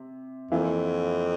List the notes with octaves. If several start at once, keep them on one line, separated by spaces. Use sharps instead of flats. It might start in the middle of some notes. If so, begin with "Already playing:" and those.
Already playing: C3
F2 E3 A#3 E4